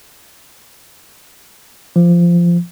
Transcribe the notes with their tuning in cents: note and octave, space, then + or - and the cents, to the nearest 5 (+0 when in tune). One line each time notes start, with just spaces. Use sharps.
F3 -15